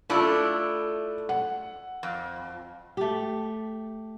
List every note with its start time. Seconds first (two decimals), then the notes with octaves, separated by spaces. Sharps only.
0.10 A3 D4 E4 F4 A4
1.29 F#5
2.03 F2
2.97 A3 G4